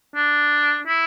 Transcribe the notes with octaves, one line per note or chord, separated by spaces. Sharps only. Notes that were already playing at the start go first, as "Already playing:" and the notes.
D4
E4